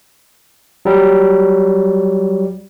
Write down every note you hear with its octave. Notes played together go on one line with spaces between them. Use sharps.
F#3 G3